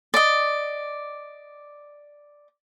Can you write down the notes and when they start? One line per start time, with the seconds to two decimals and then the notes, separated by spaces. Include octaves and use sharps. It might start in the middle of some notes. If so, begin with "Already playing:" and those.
0.14 D5 D#5